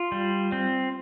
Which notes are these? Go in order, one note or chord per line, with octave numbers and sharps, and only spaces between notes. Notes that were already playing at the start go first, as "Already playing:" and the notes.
Already playing: F4
G3
C4